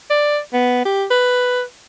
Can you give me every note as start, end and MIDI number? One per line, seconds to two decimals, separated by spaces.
0.10 0.39 74
0.53 0.85 59
0.85 1.05 67
1.11 1.63 71